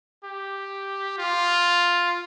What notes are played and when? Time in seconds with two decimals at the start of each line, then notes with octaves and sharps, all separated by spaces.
0.25 G4
1.18 F4